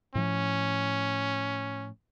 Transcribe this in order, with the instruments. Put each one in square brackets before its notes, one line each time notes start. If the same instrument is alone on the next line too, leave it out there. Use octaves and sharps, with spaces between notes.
[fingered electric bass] A2 F3 [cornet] C#4